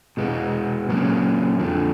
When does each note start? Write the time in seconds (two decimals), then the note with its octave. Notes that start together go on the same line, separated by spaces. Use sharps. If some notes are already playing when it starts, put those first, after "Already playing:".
0.17 B2 G#3 B3
0.88 A#2 F#3 A#3 C#4
1.59 F2 D3 F3